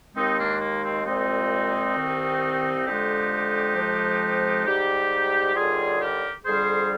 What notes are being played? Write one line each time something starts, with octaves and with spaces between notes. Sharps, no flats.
D#2 D#3 G#3 C4 D#4
A#3 D4
A#3
C4
C2 A#2 F3 G#3 C4 D#4
C2 C3 D#3
F2 D3 G#3 D#4 G4
F2 C3 F3 G#3
G#2 G3 D#4 G4
D#2 D3 G3 F4 G#4
G4 A#4
F2 D3 G3 G#4 C5